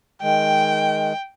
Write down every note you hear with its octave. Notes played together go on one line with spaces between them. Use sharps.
D#3 G#3 G5